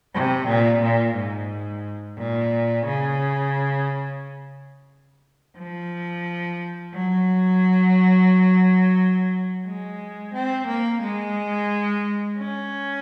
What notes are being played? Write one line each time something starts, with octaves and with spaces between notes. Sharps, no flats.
C3
A#2
A#2
G#2
A#2
C#3
F3
F#3
G#3
C4
A#3
G#3
C#4